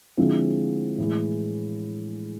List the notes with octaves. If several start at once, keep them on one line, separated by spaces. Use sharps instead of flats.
D3 F3 G#3 C4 E4
A2 E3 G#3